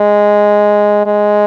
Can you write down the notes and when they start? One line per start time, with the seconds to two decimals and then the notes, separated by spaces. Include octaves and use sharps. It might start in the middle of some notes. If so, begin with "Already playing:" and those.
Already playing: G#3
1.06 G#3